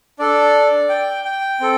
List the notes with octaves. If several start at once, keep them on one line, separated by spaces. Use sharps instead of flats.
D4 A4 D5
G5
G5
C4 A4